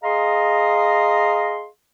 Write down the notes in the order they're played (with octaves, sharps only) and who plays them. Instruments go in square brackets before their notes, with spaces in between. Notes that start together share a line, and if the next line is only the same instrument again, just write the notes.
[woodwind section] G#4 D#5 F5 A#5 C6